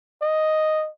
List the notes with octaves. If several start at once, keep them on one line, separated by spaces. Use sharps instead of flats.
D#5